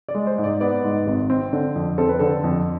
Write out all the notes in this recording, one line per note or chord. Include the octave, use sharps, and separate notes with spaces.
D5
G#3
C5
G#2
D5
B3 D5
G#2
G#1
C4
D3
F2
C4 A4
B4
D3 A4
F2